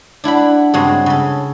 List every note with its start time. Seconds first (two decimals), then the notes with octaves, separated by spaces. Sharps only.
0.24 D4 E4 F#5 B5
0.74 G2 C#3 G#3 C4 F#4
1.06 C#3 A4